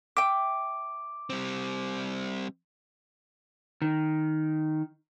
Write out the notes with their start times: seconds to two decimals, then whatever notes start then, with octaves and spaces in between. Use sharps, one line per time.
0.17 E5 G5 D6
1.30 G3 C4
3.82 D#3